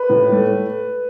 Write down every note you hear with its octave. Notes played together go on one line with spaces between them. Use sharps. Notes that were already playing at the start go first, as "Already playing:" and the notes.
Already playing: B4
A2
A3